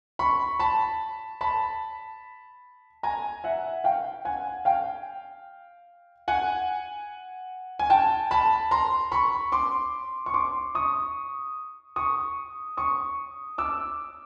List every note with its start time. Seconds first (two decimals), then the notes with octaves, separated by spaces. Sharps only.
0.19 B5 C#6
0.59 A5 B5
1.41 A5 B5
3.03 G#5 A#5
3.44 E5 F#5
3.84 F5 G5
4.25 F#5 G#5
4.65 F5 G5
6.28 F#5 G#5
7.79 G#5
7.90 G5 A5
8.31 A5 B5
8.71 A#5 C6
9.12 B5 C#6
9.52 C6 D6
10.26 C#6
10.34 C6 D6
10.75 C#6 D#6
11.96 C#6 D#6
12.77 C#6 D#6
13.58 D6 E6